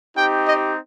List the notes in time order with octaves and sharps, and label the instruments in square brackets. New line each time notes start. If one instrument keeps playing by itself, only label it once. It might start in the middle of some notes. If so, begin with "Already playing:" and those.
[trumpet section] C4 D#4 G4 G5
D#5